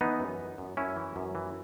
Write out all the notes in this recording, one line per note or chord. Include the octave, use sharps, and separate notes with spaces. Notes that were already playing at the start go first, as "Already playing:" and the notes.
E3 B3 D#4
F#2
F#2
F#2
F#2 C#4 E4
E3
F#2
E3